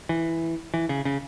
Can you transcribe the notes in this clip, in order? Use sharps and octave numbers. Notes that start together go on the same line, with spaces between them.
E3
E3
C#3
C#3